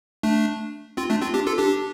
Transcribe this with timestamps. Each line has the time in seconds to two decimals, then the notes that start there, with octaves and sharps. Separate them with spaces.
0.23 A3 D4
0.97 C4 F4
1.10 A3 D4
1.22 C4 F4
1.34 D4 G4
1.47 F4 A4
1.58 D4 G4